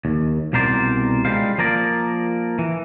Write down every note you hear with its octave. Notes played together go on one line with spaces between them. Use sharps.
D#2
C2 B2 A#4 C5 D5
C#2 C#3 G3 G#3 C5 F5
F3 A#3 A#4 D5
E3